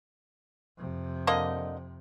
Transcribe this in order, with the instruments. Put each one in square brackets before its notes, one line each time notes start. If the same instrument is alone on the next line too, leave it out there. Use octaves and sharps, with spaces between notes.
[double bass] F2 C3
[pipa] D3 A#3 D#5